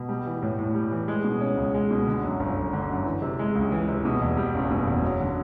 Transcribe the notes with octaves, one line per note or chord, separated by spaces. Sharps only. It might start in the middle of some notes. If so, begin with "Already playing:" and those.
Already playing: B2
G3
E3
A2
A2
G3
E3
G#3
B2
C#4
C#2
G#3
B2
D3
F#2
G1
G1
D3
F#2
E3
C3
G#3
C#2
E3
C3
B2
E2
G3
F#1
B2
E2
F#3
D3